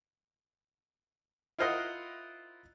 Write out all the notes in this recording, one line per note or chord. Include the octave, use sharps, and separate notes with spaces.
E4 F4 A#4 C5 D#5 F#5